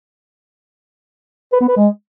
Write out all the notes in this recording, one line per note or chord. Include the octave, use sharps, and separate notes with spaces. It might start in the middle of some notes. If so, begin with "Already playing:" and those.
B4
B3
B4
G#3